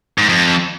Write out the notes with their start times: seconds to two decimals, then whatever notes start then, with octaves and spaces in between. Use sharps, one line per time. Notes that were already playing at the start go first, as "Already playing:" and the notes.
0.18 G#2
0.29 F2